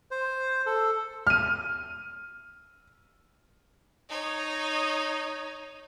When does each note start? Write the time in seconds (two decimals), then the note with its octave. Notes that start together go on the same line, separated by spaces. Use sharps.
0.11 C5
0.66 A4
1.27 F6 D#7
4.08 D#4 C#5